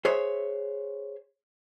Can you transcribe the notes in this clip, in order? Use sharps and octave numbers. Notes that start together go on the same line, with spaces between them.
G#4 C5 C#5 E5